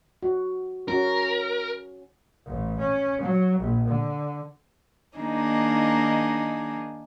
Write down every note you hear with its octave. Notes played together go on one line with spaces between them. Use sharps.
F#4
C#4 F#4 A#4
A1
C#4
F#3
A#1
D3
D#3 A#3 D4 D#4 G#4